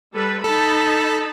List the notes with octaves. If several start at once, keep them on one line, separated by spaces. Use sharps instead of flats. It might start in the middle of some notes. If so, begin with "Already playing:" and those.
G3 A4 B4
D#4 A4 A5 B5